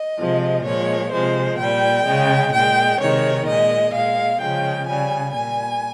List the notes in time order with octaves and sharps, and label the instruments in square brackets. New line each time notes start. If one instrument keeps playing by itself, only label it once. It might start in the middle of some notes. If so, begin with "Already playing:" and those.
Already playing: [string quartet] D#5
C3 F3 G#3
A#2 F3 G#3 C#5
C3 F3 G#3 C5
A#2 G3 G5
C#3 G#3
A#2 G#3 G5
C3 D#3 G#3 C#5
A#2 G#3 D#5
A#2 G#3 F5
C#3 F3 G#3 G5
C#3 G3 G#5
A#2 G3 G#5